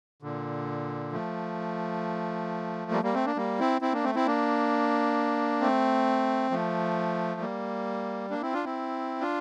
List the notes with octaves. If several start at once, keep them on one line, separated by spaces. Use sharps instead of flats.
A#2 D3
F3 A3
G3 A#3
G3 A#3
A3 C4
A#3 D4
G3 A#3
C4 E4
C4 E4
A#3 D4
A3 C4
C4 E4
A#3 D4
A3 C4
F3 A3
G3 A#3
A#3 D4
C4 E4
D4 F4
C4 E4
D4 F4